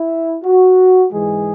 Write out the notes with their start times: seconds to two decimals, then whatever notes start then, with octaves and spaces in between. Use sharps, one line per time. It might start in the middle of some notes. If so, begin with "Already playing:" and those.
Already playing: E4
0.45 F#4
1.13 G#2 E3 G#3 G#4